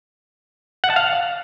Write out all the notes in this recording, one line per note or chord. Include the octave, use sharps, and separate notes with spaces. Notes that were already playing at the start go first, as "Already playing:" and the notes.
F#5
A5
F5